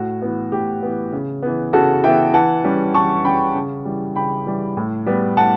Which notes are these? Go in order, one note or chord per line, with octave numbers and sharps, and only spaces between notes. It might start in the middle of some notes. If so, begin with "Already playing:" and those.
Already playing: A2 F#4
E3 B3
A2 G4
E3 B3
C#3
E3 B3
C#3 F#4 A4
E3 B3 E5 G5
E3 F#5 A5
G3 C#4
E3 A5 C#6
G3 C#4 G5 B5
C#3
E3 G3
C#3 G5 B5
E3 G3
A2
G3 B3
A2 F#5 A5